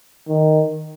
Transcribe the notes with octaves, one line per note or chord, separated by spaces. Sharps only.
D#3